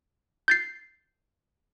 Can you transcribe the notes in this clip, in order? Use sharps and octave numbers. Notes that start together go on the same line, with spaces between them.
G6 A6 C7